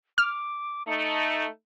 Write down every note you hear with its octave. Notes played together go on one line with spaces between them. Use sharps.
D6 F6
A3 D#4 C#7